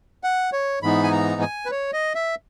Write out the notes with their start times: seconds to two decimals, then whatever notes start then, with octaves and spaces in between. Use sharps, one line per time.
0.24 F#5
0.53 C#5
0.82 G#2 E3 B3 D#4 B5
1.03 G#5
1.12 A#5
1.41 G#5
1.66 B4
1.71 C#5
1.93 D#5
2.15 E5